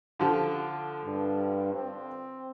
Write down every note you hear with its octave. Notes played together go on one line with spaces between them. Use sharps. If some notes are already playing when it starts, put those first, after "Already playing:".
D3 F3 G4
G2
C4